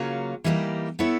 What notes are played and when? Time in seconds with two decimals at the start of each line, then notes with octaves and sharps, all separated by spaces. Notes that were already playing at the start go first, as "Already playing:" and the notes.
Already playing: C#3 F#3 A#3 C#4 F4
0.44 E3 G3 A#3 D#4 G4
0.99 B3 E4 A4 C#5